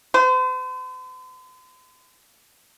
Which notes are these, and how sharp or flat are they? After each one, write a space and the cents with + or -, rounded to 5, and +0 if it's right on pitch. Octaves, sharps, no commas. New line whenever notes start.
C5 -45